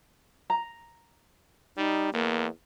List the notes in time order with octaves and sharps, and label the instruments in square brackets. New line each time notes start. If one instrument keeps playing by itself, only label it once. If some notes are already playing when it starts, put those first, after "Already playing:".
[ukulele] A#5
[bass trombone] G3 [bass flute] D#4
[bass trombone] E2 [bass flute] A#3